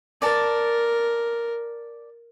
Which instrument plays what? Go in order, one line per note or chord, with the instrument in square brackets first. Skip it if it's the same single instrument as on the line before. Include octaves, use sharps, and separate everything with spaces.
[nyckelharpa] A#4 [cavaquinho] D5 A5